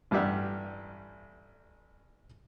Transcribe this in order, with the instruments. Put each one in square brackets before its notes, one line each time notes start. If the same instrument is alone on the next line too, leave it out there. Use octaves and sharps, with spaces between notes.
[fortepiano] A1 G2 G3 G4 E5 F#5